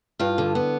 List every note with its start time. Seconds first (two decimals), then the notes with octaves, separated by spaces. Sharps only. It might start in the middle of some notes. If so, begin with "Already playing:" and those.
0.19 G2 F4
0.38 D3
0.55 B3